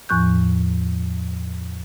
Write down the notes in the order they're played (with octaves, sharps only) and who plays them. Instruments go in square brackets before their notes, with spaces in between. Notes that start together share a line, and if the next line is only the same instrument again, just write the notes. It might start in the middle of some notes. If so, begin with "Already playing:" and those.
[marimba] E2 A2 F3 C#6 F#6 G6